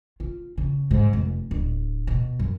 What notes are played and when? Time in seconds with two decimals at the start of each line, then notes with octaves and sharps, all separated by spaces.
0.20 F4
0.58 C#3
0.91 G#2
1.13 F1
1.51 D1
2.07 B2
2.39 F#2